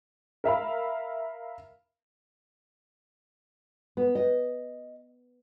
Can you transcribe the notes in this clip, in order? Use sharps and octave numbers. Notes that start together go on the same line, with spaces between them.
A#4 E5 F5 B5
B3
D#5